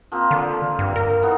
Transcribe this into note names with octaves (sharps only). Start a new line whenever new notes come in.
F3 A#3 C4
D3
G2
A#4
E3 B3 D#4